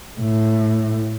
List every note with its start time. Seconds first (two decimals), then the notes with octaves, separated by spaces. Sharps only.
0.20 A2